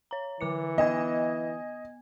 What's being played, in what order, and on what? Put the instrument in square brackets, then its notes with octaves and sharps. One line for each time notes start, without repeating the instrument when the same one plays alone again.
[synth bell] C#5 A#5
[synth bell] D3 D6 C#7 [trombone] E3
[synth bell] B3 G#5 G#6 [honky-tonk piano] D#5